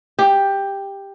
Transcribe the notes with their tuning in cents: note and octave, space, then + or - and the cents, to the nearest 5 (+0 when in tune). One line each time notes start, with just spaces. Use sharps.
G4 +10